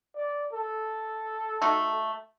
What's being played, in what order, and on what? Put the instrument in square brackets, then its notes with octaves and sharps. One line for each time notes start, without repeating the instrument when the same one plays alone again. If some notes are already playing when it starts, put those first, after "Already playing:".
[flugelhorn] D5
A4
[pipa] A3 D#4 F#4